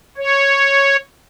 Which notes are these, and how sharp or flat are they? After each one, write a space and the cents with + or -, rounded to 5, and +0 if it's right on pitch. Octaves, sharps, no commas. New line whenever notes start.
C#5 -5